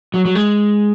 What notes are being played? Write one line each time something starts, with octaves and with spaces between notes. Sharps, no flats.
F#3
F#3
G#3